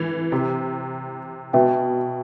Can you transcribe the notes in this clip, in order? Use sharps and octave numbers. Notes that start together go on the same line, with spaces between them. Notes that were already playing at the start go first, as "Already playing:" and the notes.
Already playing: E3
C3
B2 F#4 B4 E5 G5